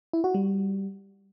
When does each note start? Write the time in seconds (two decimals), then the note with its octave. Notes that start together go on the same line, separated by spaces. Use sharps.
0.13 E4
0.24 F#4
0.34 G3